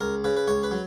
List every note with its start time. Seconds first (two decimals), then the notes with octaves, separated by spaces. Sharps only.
0.01 C#2 A#4
0.24 C#3 B4
0.37 B4
0.48 C#2 C#5
0.63 B4
0.71 F#3